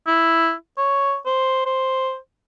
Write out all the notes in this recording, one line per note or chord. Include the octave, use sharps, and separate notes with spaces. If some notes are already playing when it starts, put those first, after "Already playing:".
E4
C#5
C5
C5